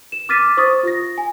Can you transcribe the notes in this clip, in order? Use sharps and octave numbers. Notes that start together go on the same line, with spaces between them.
E7
D6 F6 A6 B6 D#7
C5 C#6 D#6 A6
F4 A#6
G#5